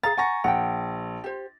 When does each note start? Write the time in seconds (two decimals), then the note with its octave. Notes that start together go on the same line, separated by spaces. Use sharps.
0.04 G#4 F5 A#5 A6
0.17 F#5 G#5 A#5 C#6 A#6
0.44 A#1 F#5 G5
1.24 G4 C5